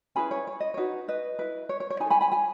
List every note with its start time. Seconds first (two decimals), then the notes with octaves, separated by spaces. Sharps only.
0.15 C#4 E4 G#4 B4 G#5 B5
0.31 C#5
0.47 C#5
0.60 D#5
0.74 D#4 F#4 B4 C#5
1.08 B4 D#5
1.39 E4 B4
1.69 C#5
1.80 C#5
1.90 C#5
2.00 D#4 G#5 B5
2.05 A4
2.10 G#5 B5
2.21 G#5 B5
2.32 G#5 B5